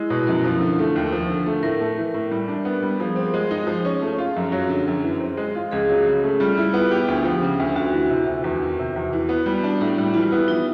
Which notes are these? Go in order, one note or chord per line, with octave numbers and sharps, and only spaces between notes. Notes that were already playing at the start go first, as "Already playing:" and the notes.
Already playing: G#3 E4
B2
F#2 A#4
F3
D3
A3
D#2
F3
D3
A3
A2 A#4
A3
E3
A2
G3
D4
B3
G3
F3 G#4
C4
G#3
D#4
F3
C#4
A3
F4
F#2
F#3
D3
F#2
E3
C4
G#3
F4
C#2 G#4
F#3
C#3
A3
G3 F4
E4
B3
G4
D2
F3
C#3
D2
D2 F#4
E3
C3
D2
E2
D#3
C3
E2
E3
B3
G3
D4
A2 G4
G3
E3 F4
B3 E4
E3 D#4